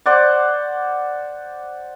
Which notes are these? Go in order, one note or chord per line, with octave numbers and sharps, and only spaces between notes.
C5 D5 F#5